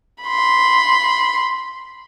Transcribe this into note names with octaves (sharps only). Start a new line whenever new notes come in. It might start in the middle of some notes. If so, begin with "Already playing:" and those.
B5 C6